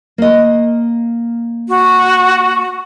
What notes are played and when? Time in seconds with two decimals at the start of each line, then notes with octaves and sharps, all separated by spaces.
0.18 A#3 D#5
1.69 F#4